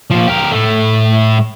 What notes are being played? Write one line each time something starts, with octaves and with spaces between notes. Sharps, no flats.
A#2 F3
G4 A#4
A2 A3